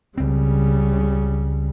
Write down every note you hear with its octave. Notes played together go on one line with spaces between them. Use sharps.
C#2 C#3 G3 C4